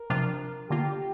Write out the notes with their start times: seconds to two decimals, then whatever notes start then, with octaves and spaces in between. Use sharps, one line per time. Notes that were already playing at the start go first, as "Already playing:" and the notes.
Already playing: A#4
0.10 C3 F3 D4 F4
0.70 D3 A#3 F4 G4